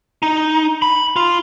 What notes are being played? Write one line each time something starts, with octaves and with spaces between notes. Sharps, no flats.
D#4
B5
F4